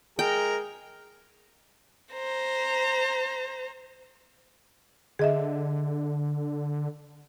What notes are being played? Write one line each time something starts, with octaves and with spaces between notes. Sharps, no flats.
G#3 G#4 A#4 G5
C5 A#5
D3 G#4 D#5 E5